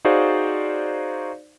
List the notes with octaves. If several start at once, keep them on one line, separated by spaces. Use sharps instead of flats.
D#4 F#4 G#4 C5 D5 F5